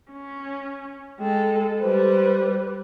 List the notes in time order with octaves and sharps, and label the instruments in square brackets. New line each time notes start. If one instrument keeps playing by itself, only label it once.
[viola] C#4
[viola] G#3 A4 [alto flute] G5
[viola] G3 B4 [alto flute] C5